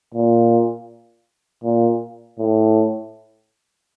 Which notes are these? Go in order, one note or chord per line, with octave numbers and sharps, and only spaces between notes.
A#2
A#2
A2